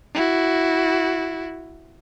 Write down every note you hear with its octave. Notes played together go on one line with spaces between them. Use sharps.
E4 F#4